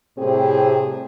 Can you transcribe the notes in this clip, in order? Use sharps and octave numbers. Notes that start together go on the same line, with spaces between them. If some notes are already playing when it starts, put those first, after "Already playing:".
A2 C3 G3 C4 G4 G#4